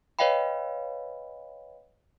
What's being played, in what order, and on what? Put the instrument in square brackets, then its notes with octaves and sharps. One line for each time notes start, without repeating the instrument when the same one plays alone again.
[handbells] B4 C#5 D#5 F5 G5 B5